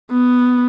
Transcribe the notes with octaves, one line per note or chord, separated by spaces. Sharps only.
B3